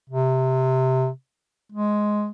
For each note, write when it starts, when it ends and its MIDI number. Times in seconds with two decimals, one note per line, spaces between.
0.10 1.09 48
1.72 2.31 56